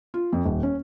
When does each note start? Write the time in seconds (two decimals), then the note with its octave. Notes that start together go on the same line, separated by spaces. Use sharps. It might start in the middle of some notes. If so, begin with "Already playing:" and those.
0.14 F4
0.33 F2
0.45 D#1
0.63 C#4